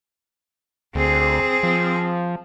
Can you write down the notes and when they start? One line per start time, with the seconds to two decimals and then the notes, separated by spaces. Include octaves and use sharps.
0.95 D2 C4 G#4
1.63 F3